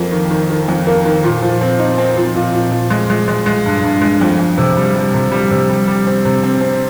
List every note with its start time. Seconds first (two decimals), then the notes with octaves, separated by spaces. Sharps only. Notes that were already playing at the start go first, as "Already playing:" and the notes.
Already playing: F2 A#3
0.12 D#3
0.31 D#3
0.50 D#3
0.68 F2
0.87 A#3
1.06 D#3
1.24 A#2
1.42 F3
1.61 C4
1.79 D#4
1.98 C4
2.17 F3
2.35 A#2
2.54 A#2
2.72 F3
2.90 G#3
3.10 G#3
3.28 G#3
3.46 G#3
3.66 G2
3.84 G2
4.02 G#3
4.21 F2
4.39 F2
4.58 C3
4.77 G3
4.95 G3
5.14 C3
5.32 G3
5.51 C3
5.69 G3
5.87 G3
6.07 C4
6.25 C3
6.43 C4
6.61 C4